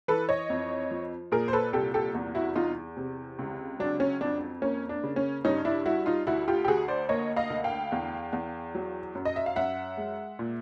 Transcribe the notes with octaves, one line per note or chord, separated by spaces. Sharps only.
E3 A4 B4
C#5 D#5
F2
F3
A#2 G#4 A#4
C5
A4 B4
C2 G4 A4
G4 A4
E2
E4 F#4
E2 D#4 F4
C3
C#2
F#3 D4
C#4
F2 D4
A#3 C#4
D4
C#3
C#4
G2 C#4 D#4
D4 E4
G3 E4 F#4
D#4 F4
D2 E4 F#4
F4 G4
G4
D2 F#4 G#4
C5 D5
A#3 C#5 D#5
D#5 F5
D2
F5 G5
E2
E2
F#3
F#2
D#5
E5
F5
F#2 E5 F#5
G#3
A#2